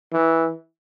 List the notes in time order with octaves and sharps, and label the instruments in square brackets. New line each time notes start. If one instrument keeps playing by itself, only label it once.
[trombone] E3